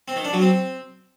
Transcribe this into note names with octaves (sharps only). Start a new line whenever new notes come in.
C4
D#3
D4
F#3
C4